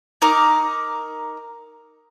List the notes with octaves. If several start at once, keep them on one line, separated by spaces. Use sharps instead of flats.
D#4 A#4 D6